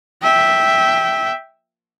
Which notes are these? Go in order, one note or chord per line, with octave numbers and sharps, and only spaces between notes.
E5 G5